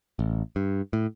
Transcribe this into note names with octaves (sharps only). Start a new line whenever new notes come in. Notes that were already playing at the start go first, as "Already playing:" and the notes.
A1
G2
A2